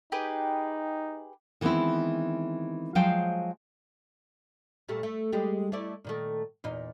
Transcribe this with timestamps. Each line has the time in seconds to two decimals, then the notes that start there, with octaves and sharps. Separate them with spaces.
0.12 D#4 G4 G#4 B4
1.61 D#3 E3 G#3 B3 C4 E4
2.95 F3 F#3 G#3 C5 F5 G5
4.89 A#2 G3 A3
5.03 A3
5.32 G3 G#3 G4
5.72 A3 E4 D5
6.04 A#2 D#3 A3
6.64 E2 A#2 D#4